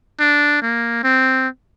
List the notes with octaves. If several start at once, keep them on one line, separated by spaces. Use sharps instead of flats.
D4
A#3
C4